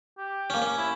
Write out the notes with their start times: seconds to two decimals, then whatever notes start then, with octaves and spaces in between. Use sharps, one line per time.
0.18 G4
0.50 A#3 C#4
0.62 C#4
0.77 E4